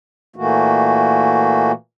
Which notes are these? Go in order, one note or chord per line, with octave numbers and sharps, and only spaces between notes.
A#2 E3 A3 A#3 F#4